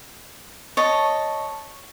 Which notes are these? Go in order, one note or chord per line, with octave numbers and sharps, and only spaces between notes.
C#5 D#5 A5